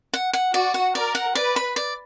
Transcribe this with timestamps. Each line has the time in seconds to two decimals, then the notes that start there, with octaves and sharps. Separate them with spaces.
0.14 F#5
0.33 F#5
0.54 F#4 D5
0.74 F#5
0.95 A#4 D5
1.15 F#5
1.35 B4 D5
1.56 B5
1.76 D5